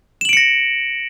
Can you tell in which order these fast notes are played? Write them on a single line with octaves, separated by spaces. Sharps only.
E7 F#7 D7 C#7 A#6